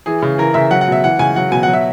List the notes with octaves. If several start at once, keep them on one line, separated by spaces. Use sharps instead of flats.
E3 G#4
C#3
E3 A#4
C#3 E5
F#3 F#5
F#5
B2 E5
E3 F#5
C#3 G#5
F#3 F#5
B2 G#5
F#3 F#5
E5